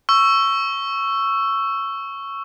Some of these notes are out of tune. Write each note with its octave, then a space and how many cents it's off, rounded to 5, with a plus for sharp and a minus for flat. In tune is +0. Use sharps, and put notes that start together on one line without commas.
C#6 +0 E6 +15